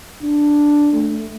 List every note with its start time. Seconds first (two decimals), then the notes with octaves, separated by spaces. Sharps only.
0.22 D4
0.93 A3